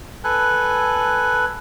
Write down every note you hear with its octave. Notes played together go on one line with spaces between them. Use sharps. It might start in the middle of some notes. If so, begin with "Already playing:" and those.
A4 B4 G#5 F#6